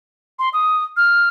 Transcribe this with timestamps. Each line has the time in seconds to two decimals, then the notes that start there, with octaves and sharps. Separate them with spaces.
0.39 C6
0.53 D#6
0.97 F6